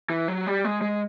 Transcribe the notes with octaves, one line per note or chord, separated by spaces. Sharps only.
E3
F#3
G3
G#3
G#3